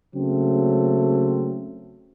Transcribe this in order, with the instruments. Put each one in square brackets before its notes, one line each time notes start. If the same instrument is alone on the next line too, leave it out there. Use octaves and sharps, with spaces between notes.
[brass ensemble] C#3 F#3 A3 A#3 C4